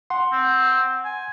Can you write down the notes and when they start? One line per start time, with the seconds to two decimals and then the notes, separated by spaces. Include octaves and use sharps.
0.10 F#5 C6
0.32 C4
1.05 G#5